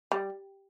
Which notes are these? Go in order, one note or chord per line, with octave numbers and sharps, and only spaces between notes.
G3